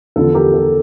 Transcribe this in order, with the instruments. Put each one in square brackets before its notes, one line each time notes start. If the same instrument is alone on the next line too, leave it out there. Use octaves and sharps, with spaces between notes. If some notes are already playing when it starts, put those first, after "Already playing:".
[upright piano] E2 D3 F3 A4
G4 A#4
A4